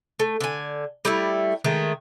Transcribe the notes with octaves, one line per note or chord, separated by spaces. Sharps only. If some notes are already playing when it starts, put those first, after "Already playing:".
A3
D3 G#5
G3 A3 E4
D#3 G#3 A3